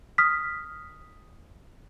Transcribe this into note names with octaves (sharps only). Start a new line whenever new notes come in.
D#6 F6 B6